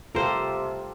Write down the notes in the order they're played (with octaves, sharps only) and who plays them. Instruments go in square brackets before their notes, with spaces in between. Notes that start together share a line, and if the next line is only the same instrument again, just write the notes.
[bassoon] C3 [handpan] F4 G4 A4 [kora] A#4 C5